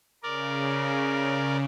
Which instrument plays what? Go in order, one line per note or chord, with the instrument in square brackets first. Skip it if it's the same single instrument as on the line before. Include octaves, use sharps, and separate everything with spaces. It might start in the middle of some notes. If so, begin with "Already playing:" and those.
[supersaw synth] C#3 [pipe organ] A#4 D5